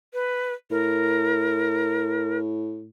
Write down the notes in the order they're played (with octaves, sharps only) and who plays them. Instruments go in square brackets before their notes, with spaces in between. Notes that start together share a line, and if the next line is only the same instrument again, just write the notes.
[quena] B4
[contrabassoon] A2 [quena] A#4